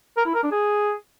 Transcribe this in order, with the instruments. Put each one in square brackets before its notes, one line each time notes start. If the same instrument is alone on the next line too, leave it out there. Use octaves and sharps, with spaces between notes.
[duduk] A#4
E4
A#4
D4
G#4